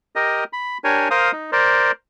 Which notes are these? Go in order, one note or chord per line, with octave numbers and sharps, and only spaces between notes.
G4 A#4 D#5
B5
D4 G4 A#4 C#5 G#5
A#4 C5 F5 D#6
D#4
A#4 C5 D5